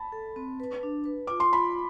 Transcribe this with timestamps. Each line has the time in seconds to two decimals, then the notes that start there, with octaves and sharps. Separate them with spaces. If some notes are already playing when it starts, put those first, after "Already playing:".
Already playing: A5 B5
0.12 A4
0.36 C4
0.60 B4
0.83 D4
1.05 B4
1.27 F4 D6
1.40 C6
1.53 F4 B5